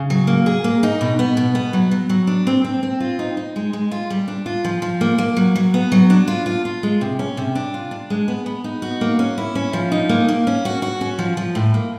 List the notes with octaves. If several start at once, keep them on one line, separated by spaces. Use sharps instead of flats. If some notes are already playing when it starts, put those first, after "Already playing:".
Already playing: C#3
F#3
A#3
G#4
A#3
D#4
B2
B3
B2
B3
F#3
F#3
F#3
D4
C4
C4
C4
F4
D#4
D#4
G#3
G#3
F4
G3
D4
F4
F3
F3
A#3
A#3
F#3
F#3
B3
F#3
D4
F4
F4
F4
G#3
C3
C#4
C3
D4
F4
D4
G#3
B3
B3
D#4
F#4
A#3
C#4
E4
C#4
F3
D#4
A#3
A#3
C#4
F#4
F#4
C#4
F3
F3
A2
A#3